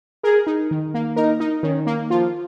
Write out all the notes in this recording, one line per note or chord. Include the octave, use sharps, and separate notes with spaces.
G#4 A#4
D#4
D#3
A#3
D#4 A#4
D#4
D#3 C#4
A#3
F3 F4